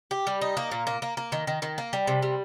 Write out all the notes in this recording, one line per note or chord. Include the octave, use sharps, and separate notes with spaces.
G4
G3
D#4
A#3
A#2
A#3
A#3
A#3
D#3
D#3
D#3
A#3
G3
C3
G3